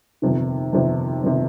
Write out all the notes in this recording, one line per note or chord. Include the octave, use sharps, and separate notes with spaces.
G1 F2 C3 D#3
G1 F2 C3 D#3
G1 C3 D#3